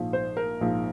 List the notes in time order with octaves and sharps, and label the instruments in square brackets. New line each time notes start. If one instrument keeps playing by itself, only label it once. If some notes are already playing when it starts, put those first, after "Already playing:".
Already playing: [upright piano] A#1 G#2 F3
C5
A#4
A#1 G#2 F3